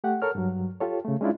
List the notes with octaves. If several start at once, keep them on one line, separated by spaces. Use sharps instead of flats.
A3 G4 F#5
A4 A#4 C#5 F6
G2 F#3
F4 G4 A4 C#5
C#3 A3
G#3 C#4 D4 E4 F4